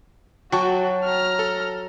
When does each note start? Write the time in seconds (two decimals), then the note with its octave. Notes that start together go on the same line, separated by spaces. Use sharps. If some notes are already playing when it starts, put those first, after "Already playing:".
0.52 F#3 F#4 G5 A5 C#6
1.04 A#5 F6
1.39 A4